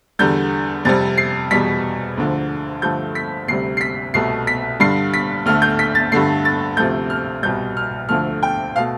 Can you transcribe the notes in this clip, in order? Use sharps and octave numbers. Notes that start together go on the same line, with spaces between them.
E2 D3 G3 G6
F2 C3 G3 A6
C7
E2 B2 G3 B6
D2 D3 F3
G2 D3 F3 A3 G6
B6
D2 C3 G3 C7
C7
B6
C2 B2 A3 C7
B6
G2 D3 G3 C7
B6
D2 D3 A3 F6
G6
B6
A6
G2 D3 A3 C7
A6
D2 C3 F3 A3 G6
F6
C2 B2 G3 G6
F6
D2 D3 F3 A3 F6
G5
B2 A3 F5